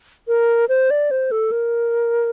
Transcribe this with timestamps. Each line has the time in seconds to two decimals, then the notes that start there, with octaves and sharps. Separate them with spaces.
0.28 A#4
0.69 C5
0.90 D5
1.11 C5
1.31 A4
1.51 A#4